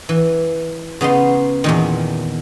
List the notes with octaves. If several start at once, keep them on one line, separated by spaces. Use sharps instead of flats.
E3
C#3 B3 D#4 C6
E2 A#2 D#3